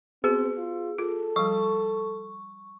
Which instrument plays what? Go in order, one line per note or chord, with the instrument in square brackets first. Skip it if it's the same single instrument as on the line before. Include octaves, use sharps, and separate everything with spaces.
[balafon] B3 F#4 [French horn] C4 [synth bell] G#4
[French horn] F4
[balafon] F4 [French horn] A4
[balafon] F3 G3 [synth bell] C#6